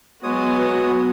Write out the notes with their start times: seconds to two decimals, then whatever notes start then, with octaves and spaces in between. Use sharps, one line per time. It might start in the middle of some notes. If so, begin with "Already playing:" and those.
0.23 F#3 G#3 B3 F#4 C#5 D#6